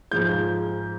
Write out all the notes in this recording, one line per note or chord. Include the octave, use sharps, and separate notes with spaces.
G#2 F3 G#3 G6